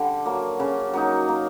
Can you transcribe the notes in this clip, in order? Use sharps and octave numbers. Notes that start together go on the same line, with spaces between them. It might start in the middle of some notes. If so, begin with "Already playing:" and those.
Already playing: D3 G3
F#3 A#3
C#3
F#3 A#3 D#4
A#3